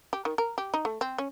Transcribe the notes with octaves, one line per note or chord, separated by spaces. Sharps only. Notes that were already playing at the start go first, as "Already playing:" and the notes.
G4
D#3
A#4
G4
D#4
A3
C4
C#4